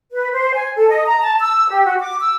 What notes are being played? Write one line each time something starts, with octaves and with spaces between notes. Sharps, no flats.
B4
C5
G#5
A4
D#5
A#5
A5
E6
G4
F#4
D6
E6